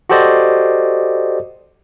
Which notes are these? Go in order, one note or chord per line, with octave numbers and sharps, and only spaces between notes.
F#4 G4 A4 C5 D5 D#5